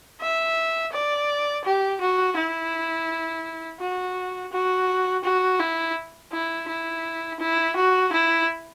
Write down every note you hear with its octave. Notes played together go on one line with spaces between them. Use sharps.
E5
D5
G4
F#4
E4
F#4
F#4
F#4
E4
E4
E4
E4
F#4
E4